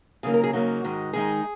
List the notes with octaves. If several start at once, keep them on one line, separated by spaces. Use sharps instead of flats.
C#3 F#3 A#3 D#4 G#4
A#4
G#4
C#3 F#3 A#3 D#4 F#4
G#2 D#3 G#3 D#4
G#2 D#3 G#3 D#4 G#4